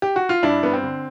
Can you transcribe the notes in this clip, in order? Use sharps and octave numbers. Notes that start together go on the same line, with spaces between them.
G4
F#4
F4
G2 D4 E4
G2 B3
C4
D3